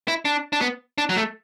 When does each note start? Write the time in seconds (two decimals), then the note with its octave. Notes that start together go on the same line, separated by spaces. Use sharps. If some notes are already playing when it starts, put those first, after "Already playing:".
0.08 E4
0.25 D4
0.53 D4
0.61 B3
0.98 D4
1.09 F#3
1.16 A3